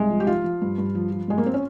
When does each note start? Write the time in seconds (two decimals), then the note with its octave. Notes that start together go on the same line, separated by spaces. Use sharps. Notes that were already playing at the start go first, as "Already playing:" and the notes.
Already playing: C2 G#3
0.10 F3
0.20 G4
0.27 F3 F4
0.44 F3
0.62 G2
0.78 G2
0.95 F3
1.12 F3
1.28 G2 G#3
1.38 A#3
1.46 C4
1.54 C#4